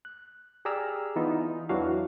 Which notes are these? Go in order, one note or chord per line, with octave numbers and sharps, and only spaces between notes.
F#6
G4 G#4 D5 A#5 E6 F6
E3 B3 D#4 F4
E2 E3 F#3 D4 F#4 F5